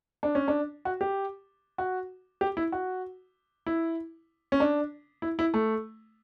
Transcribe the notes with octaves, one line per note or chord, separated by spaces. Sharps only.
D4
C#4
D4
F#4
G4
F#4
G4
E4
F#4
E4
C#4
D4
E4
E4
A3